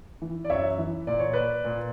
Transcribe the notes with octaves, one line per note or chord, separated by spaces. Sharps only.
E3
D5
F#2 C#5 E5
E3
A#2 D5
C#5
B4 D5
A#2